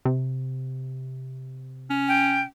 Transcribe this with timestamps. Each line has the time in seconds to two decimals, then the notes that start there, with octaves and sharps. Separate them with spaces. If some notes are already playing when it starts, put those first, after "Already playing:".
0.05 C3
1.90 C#4
2.08 G5